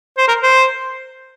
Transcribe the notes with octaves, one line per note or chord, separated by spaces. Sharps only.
C5
A#4
C5